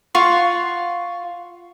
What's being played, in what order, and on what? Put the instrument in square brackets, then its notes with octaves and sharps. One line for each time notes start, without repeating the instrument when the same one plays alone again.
[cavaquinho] F4 F5 F#5 C#6